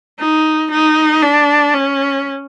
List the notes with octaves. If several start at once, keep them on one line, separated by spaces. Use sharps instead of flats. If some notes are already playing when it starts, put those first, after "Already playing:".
D#4
D#4
D4
C#4